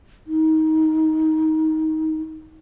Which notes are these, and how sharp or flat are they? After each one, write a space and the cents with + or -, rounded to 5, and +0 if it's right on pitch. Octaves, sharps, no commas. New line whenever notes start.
D#4 +20